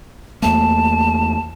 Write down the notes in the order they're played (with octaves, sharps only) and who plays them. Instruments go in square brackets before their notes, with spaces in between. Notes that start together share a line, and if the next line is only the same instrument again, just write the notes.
[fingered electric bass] E2 A3 A#3 [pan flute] A5